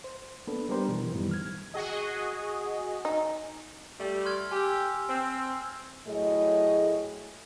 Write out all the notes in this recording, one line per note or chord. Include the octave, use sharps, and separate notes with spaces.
C5
A#3 B3 D4 A4 B4
G3 B3 D4 G4 A#4 C5
B2 E3
F#2 A2 D#3 E3 G3 B3
F6 G#6
F#4 G#4 D#5
D#4
G3 A3
C6 F6 G#6
G4 G#5 E6
C4
A2 F#3 A3 E4 G#4 D#5